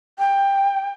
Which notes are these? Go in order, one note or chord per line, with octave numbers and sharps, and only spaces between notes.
G5